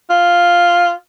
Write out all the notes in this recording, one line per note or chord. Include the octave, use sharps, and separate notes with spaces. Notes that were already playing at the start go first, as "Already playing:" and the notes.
F4